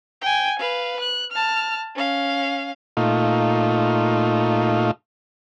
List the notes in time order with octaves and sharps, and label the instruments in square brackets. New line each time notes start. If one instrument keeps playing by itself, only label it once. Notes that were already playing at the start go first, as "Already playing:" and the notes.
[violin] G5 G#5
B4 F5
F#6
A5 F6
C#4 F5
[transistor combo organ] A#2 A3 D#4 F4